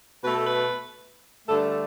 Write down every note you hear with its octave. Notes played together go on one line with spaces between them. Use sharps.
B2 A3 B4
A4
B4
G2 D3 A3 A4